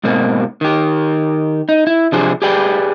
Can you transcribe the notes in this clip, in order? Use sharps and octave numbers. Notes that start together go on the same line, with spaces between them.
G#2 B2 A#3 C4
D#3 G4
D#4
E4
C3 F3 D4 G4 G#4 C5
G4 G#4 B4 D5 G5